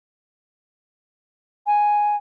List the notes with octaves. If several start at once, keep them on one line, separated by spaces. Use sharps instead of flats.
G#5